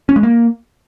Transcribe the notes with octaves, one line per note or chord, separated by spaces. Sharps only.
C#4
G#3
A#3